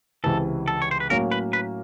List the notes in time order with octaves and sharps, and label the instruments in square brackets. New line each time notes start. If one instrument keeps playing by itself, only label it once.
[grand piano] C#2 C3 E3 [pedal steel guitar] A4
[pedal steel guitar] A4
C#5
C5
B4
[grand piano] A2 F#3 A#3 C#4 [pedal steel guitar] A#4
[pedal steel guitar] B4
B4